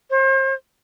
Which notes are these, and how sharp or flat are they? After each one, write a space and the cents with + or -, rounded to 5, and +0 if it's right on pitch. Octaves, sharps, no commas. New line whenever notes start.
C5 +35